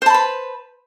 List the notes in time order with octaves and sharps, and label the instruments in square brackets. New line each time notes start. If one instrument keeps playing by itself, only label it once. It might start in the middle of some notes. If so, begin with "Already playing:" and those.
[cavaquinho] C5
A5
B5
B4